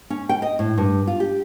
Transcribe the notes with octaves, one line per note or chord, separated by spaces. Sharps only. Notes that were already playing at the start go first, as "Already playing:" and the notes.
C#4
G5
D#5
A2
G2
F4
G4